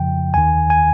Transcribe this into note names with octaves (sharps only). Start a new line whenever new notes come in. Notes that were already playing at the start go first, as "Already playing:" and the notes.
Already playing: F2 C#3 F3 G5
D#2 D#3 G#5
G#5